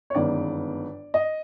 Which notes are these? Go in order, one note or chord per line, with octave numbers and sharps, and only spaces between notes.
C#5
G1 F#2 D#3 G#3 B3 D5
D#5